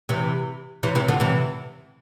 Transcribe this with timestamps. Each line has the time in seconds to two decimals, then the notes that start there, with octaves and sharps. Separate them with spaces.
0.09 C3 E3
0.83 C3 E3
0.95 C3 E3
1.08 D3 F3
1.20 C3 E3